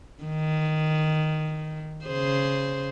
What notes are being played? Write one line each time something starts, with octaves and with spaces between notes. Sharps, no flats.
D#3
C#3 G#4 C5